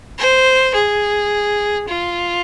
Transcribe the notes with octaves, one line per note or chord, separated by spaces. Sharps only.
C5
G#4
F4